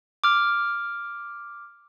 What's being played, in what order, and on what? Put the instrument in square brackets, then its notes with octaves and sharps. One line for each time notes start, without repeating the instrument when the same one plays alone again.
[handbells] D6 F6